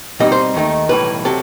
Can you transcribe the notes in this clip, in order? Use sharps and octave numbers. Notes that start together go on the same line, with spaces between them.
B2 G3 C4 D#4 D#5
C5
D#2 D#3 A3 D#4
B1 A2 E3 G3 B4
C3 F#3 A4